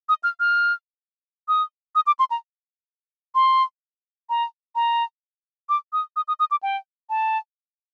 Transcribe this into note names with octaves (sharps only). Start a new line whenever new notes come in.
D#6
F6
F6
D#6
D#6
D6
C6
A#5
C6
A#5
A#5
D6
D#6
D#6
D#6
D#6
D6
G5
A5